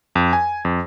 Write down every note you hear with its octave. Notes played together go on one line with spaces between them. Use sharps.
F2
G#5
F2